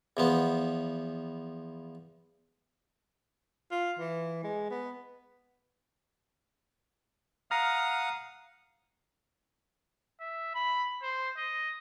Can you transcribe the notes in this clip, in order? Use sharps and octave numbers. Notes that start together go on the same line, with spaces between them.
E2 F3 B3
F4
E3
G#3
B3
F5 F#5 A#5 D#6 F6
E5
B5
C5
D#5